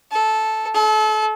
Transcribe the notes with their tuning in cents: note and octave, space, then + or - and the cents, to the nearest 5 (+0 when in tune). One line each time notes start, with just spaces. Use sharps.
A4 -10
A4 -35